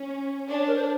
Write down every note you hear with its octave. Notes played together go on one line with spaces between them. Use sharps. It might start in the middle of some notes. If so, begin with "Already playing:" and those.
Already playing: C#4
D4 D5
C#5
A#4
C5